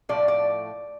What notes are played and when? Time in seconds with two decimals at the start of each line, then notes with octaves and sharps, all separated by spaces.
0.09 A2 F3 A3 D5
0.28 D5